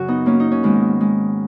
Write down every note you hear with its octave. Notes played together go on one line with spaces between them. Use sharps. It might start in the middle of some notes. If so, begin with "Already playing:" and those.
Already playing: F#2 C#3 F#4
B3 D#4
A#3 C#4
D#4
C#4
G#2 D#3 G#3 B3
G#3